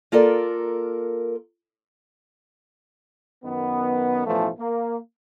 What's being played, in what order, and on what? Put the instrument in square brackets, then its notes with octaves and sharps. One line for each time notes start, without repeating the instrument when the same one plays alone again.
[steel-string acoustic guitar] A#3 F4 A4 A#4 D5
[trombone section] F#2 D#3 B3
A1 B2 E3 F3 A3
A#3